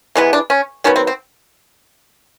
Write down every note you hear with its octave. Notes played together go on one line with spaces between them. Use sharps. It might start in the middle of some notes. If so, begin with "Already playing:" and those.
C3 E3 G#3 B3
D4
C#4
D#3 F#3 B3 C#4
C4
C4